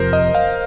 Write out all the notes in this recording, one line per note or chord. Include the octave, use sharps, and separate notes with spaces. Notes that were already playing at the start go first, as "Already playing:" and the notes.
Already playing: F2 C3 F3 A#4 C5
D#5
F5